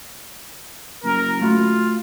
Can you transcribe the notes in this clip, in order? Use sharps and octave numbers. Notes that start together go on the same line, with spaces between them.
F#1 A#4
A3 F4 F#4 B5